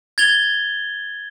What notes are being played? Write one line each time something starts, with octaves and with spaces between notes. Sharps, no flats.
G#6 A6 F7 G7